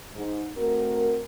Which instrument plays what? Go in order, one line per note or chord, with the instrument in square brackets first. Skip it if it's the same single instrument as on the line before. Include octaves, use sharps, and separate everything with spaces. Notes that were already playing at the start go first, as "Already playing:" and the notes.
[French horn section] G#2
A3 C4 F#4 A#4